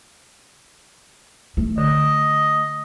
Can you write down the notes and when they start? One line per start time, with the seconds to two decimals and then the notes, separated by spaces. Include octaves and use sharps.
1.57 A3
1.78 D3 D#5